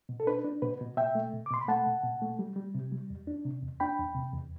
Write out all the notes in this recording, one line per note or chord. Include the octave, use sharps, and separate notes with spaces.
B2
A4
D4 B4
D4
B2 B4
B2
B2 E5 G5
A3
B2
D6
B2 C6
B5
A3 F#5 A5
B2
B2
A3
G3
G3
C3
G3
E2
D4
C3
E2
D4 G5 B5
E2
C3
E2